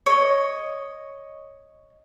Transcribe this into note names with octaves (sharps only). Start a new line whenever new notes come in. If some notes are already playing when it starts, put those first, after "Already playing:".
C#5 D#5